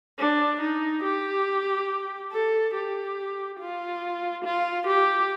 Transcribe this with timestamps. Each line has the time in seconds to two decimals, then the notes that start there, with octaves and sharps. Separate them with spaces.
0.19 D4
0.61 D#4
1.04 G4
2.32 A4
2.74 G4
3.60 F4
4.45 F4
4.88 G4